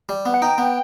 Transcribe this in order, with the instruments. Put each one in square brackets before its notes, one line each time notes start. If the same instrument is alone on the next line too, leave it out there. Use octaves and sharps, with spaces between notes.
[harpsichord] G3
B3
[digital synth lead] F#5
[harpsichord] D#4 [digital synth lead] G5
[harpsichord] B3